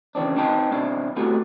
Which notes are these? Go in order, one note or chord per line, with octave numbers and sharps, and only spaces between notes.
C#3 E3 F#3 C4 D4
C4 D#4 B4 G5 A5
B1 C4 D4 E4
A3 B3 C4 E4 F#4 G4